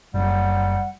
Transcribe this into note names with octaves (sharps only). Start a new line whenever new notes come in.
F#1 G3 F#5